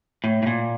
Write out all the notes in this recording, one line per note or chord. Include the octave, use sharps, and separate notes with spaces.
A2
A2
A#2